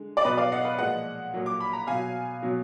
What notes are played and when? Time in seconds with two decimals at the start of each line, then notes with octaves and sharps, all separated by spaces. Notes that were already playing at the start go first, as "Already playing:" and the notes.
Already playing: D3 G#3
0.17 D5
0.24 B2 F#3 B4 D#5
0.37 D5 F5
0.52 D#5 F#5
0.65 B4
0.79 A#2 F3 G#3 D#5 F#5
1.34 A#2 F#3
1.46 D6
1.60 B5
1.73 A#5
1.87 B2 F#3 F5 G#5
2.42 B2 F#3